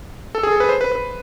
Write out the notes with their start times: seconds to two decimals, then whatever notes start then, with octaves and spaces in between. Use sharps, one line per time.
0.35 A4
0.43 G#4
0.52 A4
0.60 B4
0.69 C5
0.81 B4
0.92 B4